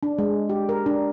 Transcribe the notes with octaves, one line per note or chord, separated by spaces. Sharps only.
D4
G#3
G4
A#4
D4